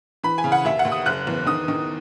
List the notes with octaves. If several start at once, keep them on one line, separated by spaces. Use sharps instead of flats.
E3 B5
G#5
C#3
F#5
D#2 E5
F#5
D#2
D#6
F#1 F#6
E2
D#3 D#6
D#3